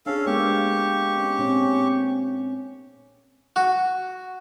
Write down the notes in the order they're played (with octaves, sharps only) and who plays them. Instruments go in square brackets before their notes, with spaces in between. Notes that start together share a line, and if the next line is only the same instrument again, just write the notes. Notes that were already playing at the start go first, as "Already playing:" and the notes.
[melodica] C#4 A4 F5 [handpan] D4 G#4
[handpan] G#3 A#3 B3 [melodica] G4 C#6
[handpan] C#4
A#2 C4 C#4
[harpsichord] F#4